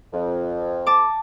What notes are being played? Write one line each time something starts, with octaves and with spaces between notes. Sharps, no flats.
F2
A5 D6